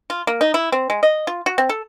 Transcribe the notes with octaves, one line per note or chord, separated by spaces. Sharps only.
F4
A#3
D#4
E4
C4
G#3
D#5
F4
F#4
C4
A4